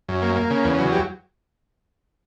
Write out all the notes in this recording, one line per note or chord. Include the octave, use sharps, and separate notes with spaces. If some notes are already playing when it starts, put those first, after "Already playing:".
F#2
A#3
A#3
C#3
E2
F#3
G4